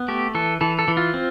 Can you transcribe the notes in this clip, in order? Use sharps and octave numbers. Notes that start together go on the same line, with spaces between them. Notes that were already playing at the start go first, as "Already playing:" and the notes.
Already playing: B3
A3 G4
E3 A4
E3 A4
A4
E3
F4
C4